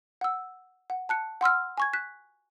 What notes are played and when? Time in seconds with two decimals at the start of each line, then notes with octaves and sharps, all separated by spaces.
0.21 F#5 E6
0.90 F#5
1.09 A5 F#6 C#7
1.41 F#5 C6 E6 F6
1.78 G#5 C#6 G#6
1.93 F#6 B6